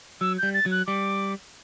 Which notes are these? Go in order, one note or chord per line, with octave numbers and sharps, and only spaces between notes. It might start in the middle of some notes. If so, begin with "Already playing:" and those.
F#3 E6
G3 G6
A6
F#3
F#6
G3 D6